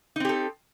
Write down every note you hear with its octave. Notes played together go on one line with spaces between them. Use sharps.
C4 D#4 G4 A4